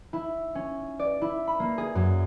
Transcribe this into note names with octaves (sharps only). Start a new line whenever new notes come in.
E4
C#4
D5
E4
B5
A#3
G#4
F#2